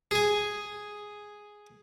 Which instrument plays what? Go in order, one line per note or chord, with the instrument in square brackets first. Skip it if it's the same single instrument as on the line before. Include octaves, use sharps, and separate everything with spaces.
[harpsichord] G#4 G#5